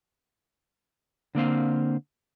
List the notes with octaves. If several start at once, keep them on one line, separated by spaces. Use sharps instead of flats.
D3 A#3 C4 F5